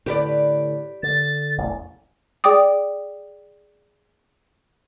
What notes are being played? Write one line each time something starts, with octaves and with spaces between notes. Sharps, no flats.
A2 D3 G4 B4 D5
D3 A6
E1 A1 E2
G#4 D5 G5 D6 D#6